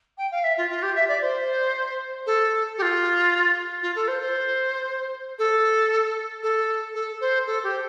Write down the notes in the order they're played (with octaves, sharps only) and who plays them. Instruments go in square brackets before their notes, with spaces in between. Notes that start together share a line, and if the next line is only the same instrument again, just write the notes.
[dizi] G5
F5
E5
F4
F4
G4
E5
D5
C5
A4
G4
F4
F4
A4
C5
C5
A4
A4
A4
C5
A4
G4